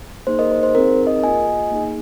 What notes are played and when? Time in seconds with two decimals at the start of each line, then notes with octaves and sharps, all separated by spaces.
0.27 A#3 D#4 G#4 C5
0.39 A#4 D#5
0.52 C5
0.63 C5
0.75 C4 D#4 G#4 A#4
1.07 A#4 D#5
1.23 A#3 F4 G#4 D#5 G#5
1.71 A#3 D#4 G#4